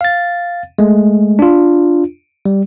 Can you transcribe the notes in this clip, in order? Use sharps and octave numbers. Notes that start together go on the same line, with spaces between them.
F5 A6
G#3 A3
D4 F4
G3